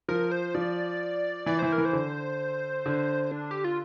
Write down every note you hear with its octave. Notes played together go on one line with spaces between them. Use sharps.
F3 A#4
C5
F3 D5
E3 D5
E3 C5
A#4
E3
C5
D3
D3
D4
G4
F4